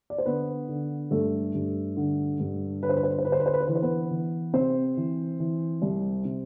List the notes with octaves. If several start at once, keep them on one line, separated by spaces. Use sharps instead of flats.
D5
C5
D3 B3 B4
D3
G2 A3 A4
G2
D3
G2
D3 B4
C5
B4
C5
B4
C5
D3 B4
C5
B4
C5
B4
C5
E3 B4
C5
B3 B4
E3
C3 C4 C5
E3
E3
C2
C3